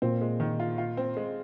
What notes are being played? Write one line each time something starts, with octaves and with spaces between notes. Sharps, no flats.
A#2 C4
G#3
D#3
F4
F4
C4
G#3